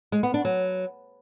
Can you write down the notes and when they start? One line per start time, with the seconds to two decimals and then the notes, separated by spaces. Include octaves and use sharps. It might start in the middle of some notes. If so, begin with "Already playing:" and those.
0.12 G#3
0.23 B3
0.34 D4
0.45 F#3